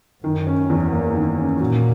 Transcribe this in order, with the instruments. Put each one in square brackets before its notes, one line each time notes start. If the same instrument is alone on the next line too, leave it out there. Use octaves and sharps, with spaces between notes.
[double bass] F#2 [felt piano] D#3
[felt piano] C#4
E2
A#3
D#3
C#4
[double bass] A#2 [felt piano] F#3